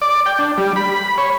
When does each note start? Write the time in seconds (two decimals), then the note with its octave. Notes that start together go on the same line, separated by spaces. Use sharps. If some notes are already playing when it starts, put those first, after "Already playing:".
0.02 D5
0.26 G5
0.39 D4
0.58 G3
0.76 B5
1.18 C#5